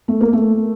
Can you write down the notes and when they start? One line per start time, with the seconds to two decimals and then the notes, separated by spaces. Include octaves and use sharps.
0.08 A3
0.21 A#3
0.33 A3